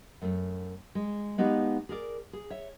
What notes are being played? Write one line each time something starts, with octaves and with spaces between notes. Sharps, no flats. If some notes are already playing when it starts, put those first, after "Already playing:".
F#2 A3
G#3
G#3 B3 D#4 G4 B4 F5
G#4 A#4 D5
G#4
C#5 E5